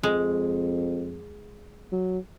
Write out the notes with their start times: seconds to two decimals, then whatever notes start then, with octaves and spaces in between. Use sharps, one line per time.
0.03 F2 G#3
1.92 F#3